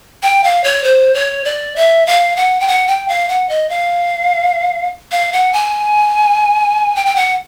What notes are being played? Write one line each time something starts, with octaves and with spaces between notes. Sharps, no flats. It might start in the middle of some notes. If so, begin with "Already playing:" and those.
G5
F5
C#5
C5
C#5
D5
E5
F5
F#5
G5
F#5
G5
F5
F#5
D#5
F5
F5
F#5
G#5
G5
G5
F#5